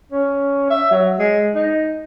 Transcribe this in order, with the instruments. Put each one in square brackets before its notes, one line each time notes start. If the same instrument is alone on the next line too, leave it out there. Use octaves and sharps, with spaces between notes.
[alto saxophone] C#4
E5
F#3
G#3
D#4